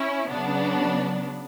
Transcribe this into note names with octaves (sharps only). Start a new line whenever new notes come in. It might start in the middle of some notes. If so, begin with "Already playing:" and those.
Already playing: C#4 E4
C#3 F#3 B3 D4